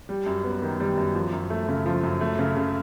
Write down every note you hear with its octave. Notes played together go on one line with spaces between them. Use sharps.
G3
F#2
B3
D#3
G3
F#2
F3
F#2
A3
C#3
F3
F#2
A3
C#3
C#3